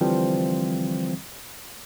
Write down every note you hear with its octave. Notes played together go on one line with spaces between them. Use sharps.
D3 E3 F3 G3 C4